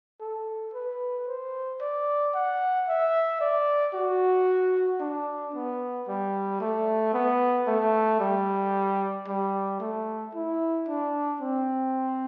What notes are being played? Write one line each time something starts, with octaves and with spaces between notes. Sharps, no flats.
A4
B4
C5
D5
F#5
E5
D5
F#4
D4
B3
G3
A3
B3
A3
G3
G3
A3
E4
D4
C4